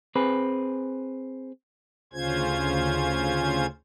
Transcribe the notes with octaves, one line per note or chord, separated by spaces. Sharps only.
C4 G#4 B4
D2 C#3 C#4 F4 C5 G#6